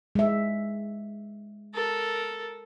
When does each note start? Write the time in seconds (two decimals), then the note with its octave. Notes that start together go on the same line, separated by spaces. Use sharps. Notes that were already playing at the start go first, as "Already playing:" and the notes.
0.15 G#3 E5
1.74 A4 A#4